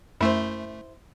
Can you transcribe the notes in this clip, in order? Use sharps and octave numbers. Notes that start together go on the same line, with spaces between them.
F#2 A3 E4 C5